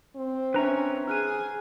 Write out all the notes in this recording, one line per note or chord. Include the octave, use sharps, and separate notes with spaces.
C4
C#4 D4 B4 E5 A#5
G#4 F6 F#6 D#7